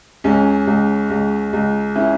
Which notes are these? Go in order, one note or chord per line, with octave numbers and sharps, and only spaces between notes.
C#2 C#4
C#2
C#2
C#2
C#4 E4